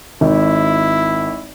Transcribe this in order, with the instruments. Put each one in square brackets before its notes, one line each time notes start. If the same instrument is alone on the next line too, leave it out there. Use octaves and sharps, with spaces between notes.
[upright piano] G#1 [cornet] E4